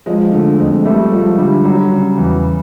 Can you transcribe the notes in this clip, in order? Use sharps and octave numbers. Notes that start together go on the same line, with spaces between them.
F3 G#3
D3 A3
F2 G#3
G3 A3
F3 G#3
D3 G3
F#3 G3
C#3
E2